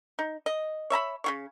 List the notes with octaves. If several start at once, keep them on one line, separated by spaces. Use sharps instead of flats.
D#4
D#5
C#5 E5 A#5 B5
C#3 F4 C#5